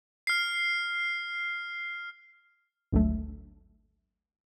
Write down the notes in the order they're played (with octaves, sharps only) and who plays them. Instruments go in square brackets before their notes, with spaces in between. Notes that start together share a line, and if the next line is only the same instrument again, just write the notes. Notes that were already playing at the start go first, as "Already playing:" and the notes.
[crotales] F6 C7
[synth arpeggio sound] G#1 D2 F#3 A3